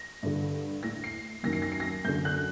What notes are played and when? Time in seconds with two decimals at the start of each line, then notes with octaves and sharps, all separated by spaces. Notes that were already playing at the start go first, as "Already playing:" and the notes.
Already playing: A#6
0.23 G2 D3
0.83 A2 A#6
1.04 C7
1.43 F#2 D#3 A#6
1.53 C7
1.62 A#6
1.72 C7
1.80 A#6
2.05 F#2 D3 G6
2.25 F#6